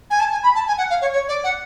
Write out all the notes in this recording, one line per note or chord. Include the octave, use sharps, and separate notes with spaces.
G#5
A5
G#5
B5
A5
G#5
F#5
F5
C#5
C#5
D5
F#5